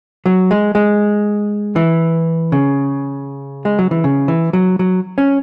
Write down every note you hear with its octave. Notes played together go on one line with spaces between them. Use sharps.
F#3
G#3
G#3
E3
C#3
G#3
F#3
E3
C#3
E3
F#3
F#3
C#4